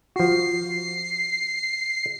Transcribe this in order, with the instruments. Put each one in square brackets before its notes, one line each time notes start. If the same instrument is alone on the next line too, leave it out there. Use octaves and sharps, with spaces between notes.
[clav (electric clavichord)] F3 F#4 [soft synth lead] C7